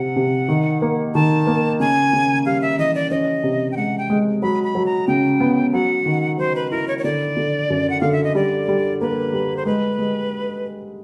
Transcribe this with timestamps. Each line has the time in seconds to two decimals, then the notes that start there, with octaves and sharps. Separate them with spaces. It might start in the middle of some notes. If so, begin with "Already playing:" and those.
Already playing: C3 F#5
0.16 C3
0.48 D#3
0.82 A#3
1.14 D#3 A5
1.47 A#3
1.80 C#3 G#5
2.13 C#3
2.45 G3 F5
2.62 E5
2.79 E3 D#5
2.95 D5
3.11 C#4 D#5
3.44 C3
3.72 G5
3.76 G#3 F#5
3.98 G5
4.10 G#3
4.42 F#3 B5
4.64 B5
4.75 F#3
4.86 A#5
5.08 C#3 G5
5.40 B3
5.73 F#3 F#5
6.06 D#3
6.38 F#3 C5
6.55 B4
6.71 E4 A#4
6.88 C#5
6.98 C#5
7.04 D3 D5
7.37 D3
7.70 F#2
7.90 F#5
8.01 D3 F5
8.12 E5
8.24 D#5
8.35 G3 D5
8.68 G3
9.01 A#3 B4
9.33 G3
9.57 C5
9.66 G#3 B4
9.99 G#3